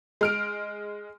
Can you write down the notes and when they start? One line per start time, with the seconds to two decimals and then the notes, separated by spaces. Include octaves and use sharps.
0.21 G#3 F6 D7